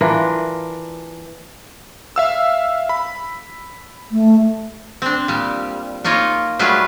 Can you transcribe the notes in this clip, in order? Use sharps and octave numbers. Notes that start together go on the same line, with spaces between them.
E3 D4 F4 A#4
E5 F5 E6
B5
A3
C4 D4
A#2 G3
A#3 D#4 F4 C#5 D#5
F#3 G3 A3 F4 G#4 B4